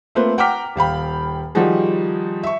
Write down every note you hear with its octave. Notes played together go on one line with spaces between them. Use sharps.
A3 A#3 C4 F4 B4
F#5 G5 A#5 D6 F6 B6
D#1 F5 G5 B5
D#3 F3 G3 D#4 F#4 G#4
E5 C#6